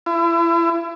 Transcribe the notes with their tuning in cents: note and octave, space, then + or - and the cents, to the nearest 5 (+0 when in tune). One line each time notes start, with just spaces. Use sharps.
E4 +35